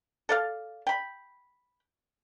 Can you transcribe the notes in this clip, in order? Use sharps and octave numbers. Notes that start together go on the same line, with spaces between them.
A4 D5 F5
G5 B5